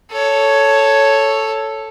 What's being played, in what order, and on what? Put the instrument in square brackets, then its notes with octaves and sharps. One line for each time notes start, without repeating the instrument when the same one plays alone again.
[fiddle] A4 C#5